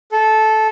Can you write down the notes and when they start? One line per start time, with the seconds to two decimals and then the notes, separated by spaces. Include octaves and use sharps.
0.12 A4